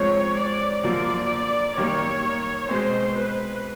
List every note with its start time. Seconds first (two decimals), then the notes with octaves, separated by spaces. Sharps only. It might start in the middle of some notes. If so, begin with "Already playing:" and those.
Already playing: G#2 F3 G#3 C4 C#5
0.38 D5
0.84 F#2 D3 F3 A#3 D5
1.77 F#2 D#3 G3 A#3 C#5
2.69 B2 G#3 C4 C5
3.16 B4